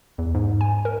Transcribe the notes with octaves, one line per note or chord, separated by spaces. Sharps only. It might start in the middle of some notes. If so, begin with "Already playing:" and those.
E2
G#2
G#5
A#4